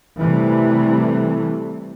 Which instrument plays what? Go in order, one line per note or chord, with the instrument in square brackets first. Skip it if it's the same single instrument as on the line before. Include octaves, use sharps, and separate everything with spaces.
[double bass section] C3 E3 G3 A3